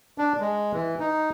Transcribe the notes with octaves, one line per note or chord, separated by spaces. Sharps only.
D4
G#3
E3
D#4